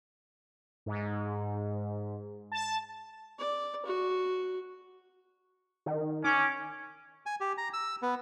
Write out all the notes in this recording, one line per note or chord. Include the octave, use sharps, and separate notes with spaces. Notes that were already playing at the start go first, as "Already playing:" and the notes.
G#2
A5
D5
F#4
D#3
C#4 D6
G#5
G4
A#5
E6
B3